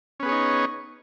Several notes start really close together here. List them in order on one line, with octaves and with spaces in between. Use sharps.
C#4 B3 G#4 C#5 D#4